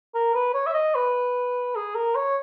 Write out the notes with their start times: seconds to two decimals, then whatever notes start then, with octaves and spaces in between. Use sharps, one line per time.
0.15 A#4
0.35 B4
0.54 C#5
0.66 E5
0.74 D#5
0.95 B4
1.75 G#4
1.95 A#4
2.15 C#5